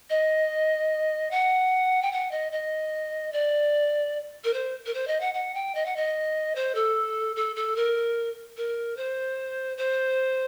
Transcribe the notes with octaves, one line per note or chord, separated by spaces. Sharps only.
D#5
F#5
G5
F#5
D#5
D#5
D5
A#4
C5
A#4
C5
D#5
F#5
F#5
G5
D#5
F#5
D#5
C5
A4
A4
A4
A#4
A#4
C5
C5